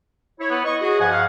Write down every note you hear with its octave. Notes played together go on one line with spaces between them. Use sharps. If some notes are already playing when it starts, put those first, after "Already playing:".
E4 C#5
B3
D#5 C#6
F#4 G#4
G2 F3 F#5 G#5
F5